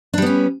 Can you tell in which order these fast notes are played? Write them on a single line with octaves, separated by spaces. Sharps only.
D4 G3 B3 C#4